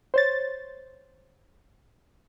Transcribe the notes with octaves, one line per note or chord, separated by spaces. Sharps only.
C5 C#5 A6